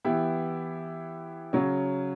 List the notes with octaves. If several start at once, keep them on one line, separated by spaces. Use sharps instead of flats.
E3 B3 E4 G4
C#3 F#3 C#4